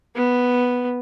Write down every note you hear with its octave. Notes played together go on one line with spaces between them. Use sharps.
B3